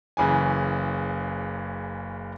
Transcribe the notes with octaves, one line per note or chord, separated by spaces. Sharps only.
F#1 C#3 E3 G#5